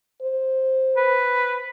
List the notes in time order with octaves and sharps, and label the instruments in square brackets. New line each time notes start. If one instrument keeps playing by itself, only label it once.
[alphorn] C5
[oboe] B4